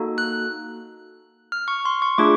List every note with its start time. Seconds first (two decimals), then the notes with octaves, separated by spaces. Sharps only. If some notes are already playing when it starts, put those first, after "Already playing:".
Already playing: A#3 D#4 F#4 A4
0.18 F#6
1.52 F6
1.68 C#6
1.85 C6
2.02 C#6
2.18 A3 D4 F4 G#4 D6